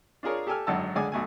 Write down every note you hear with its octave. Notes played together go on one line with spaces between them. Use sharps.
D4 F4 G#4 A#4 C#5
G4 A4 G5 G#5 E6 F6
G#1 F#2 D3 F#4 A5 E6
C#2 D3 G#3 D5 G#5 D#6
B1 A3 G#5